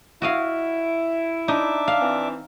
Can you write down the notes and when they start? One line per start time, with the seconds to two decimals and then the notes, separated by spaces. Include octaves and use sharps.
0.22 E4 F#4 D#5 F5
1.48 D4 D#4 E5 D6
1.88 F5
2.01 E3 C4